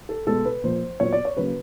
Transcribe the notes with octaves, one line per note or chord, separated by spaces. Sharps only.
A4
B2 G#3 B3 A4
B4
A#2 F3 A#3 C5
A#2 F#3 B3 C#5
D5
C#5
C#3 F#3 A#3 B4